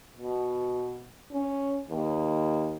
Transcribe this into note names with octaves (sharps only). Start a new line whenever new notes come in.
B2
C#4
D#2